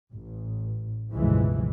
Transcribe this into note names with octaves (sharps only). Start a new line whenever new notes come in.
A1
G1 C#2 B2 E3 F3 G#3